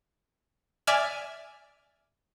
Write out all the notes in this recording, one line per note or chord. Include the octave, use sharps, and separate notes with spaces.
D5 E5 G#5 F6